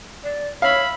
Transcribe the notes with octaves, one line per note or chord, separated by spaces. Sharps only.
D5
C#5 E5 F5 B5